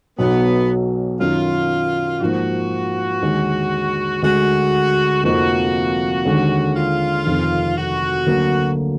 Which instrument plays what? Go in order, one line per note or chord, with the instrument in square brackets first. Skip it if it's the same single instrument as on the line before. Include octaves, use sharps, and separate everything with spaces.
[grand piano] B1 B2 F#3 [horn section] B3
[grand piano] F#2 D#3 F#3 [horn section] F4
[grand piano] G#2 F3 A#3 [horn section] F#4
[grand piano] D#2 D3 G#3
[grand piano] D2 D3 G#3 [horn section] F#4
[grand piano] F1 F2 F3 A#3 D#4 [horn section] F#4
[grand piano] D#2 D3 G#3
[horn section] F4
[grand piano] F1 F2 D#3
[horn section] F#4
[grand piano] D2 D3 F#3 A#3